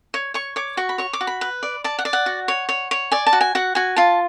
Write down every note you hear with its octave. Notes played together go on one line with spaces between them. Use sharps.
C#5
C#5 C#6
C#5 D6
F#4 C#6
B5
C#5 C#6
D6
F#4
B5
B4
D5
D5 A5
F#5
D5
F#5
F#4
C#5
C#5
C#5
D5 G#5
A5
F#4
G#5
F#4 F#5
F#4 G#5
F4 A5